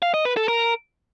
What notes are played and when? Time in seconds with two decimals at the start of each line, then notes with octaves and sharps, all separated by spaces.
0.02 F5
0.14 D#5
0.25 B4
0.37 A4
0.48 A#4